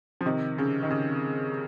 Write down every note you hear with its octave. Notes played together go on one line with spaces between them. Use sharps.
F3
C3 D#3
C#3
D#3
C#3